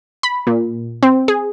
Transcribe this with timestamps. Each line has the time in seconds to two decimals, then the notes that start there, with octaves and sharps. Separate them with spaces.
0.23 B5
0.47 A#2
1.03 C4
1.28 G#4